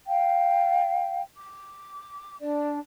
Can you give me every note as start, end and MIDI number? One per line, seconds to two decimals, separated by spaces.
0.07 1.20 77
0.07 1.20 79
1.36 2.36 86
2.39 2.78 62
2.39 2.78 74